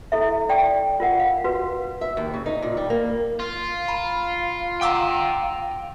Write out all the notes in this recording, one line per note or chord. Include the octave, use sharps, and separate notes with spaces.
E4 A4 E5
D5 G5 C#6
F4 A#4 F#5
F5
F#4 B4
E5
D#2
C#3
D#4
A#2
G3
A#3
F4
F5 A#5 B5
F#5 G5 A#5 D6 E6